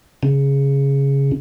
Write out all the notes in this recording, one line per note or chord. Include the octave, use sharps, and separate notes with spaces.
C#3